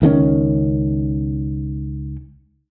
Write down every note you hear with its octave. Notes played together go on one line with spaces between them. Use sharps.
C#2 D#3 G#3 C#4